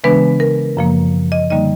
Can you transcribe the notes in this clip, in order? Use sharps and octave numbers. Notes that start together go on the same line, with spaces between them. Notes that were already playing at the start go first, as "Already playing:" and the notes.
C#3 E3 G#3 B3 D4 B4
A#4
F#2 C#3 F3 A#3
D#5
D3 G3 A#3 D#4 D#5